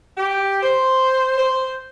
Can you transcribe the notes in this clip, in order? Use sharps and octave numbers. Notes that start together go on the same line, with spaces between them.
G4
C5
C5